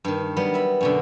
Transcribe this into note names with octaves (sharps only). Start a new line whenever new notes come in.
G2 D#3
F#3 G3 B3
E5 B5
F#2 B2 D3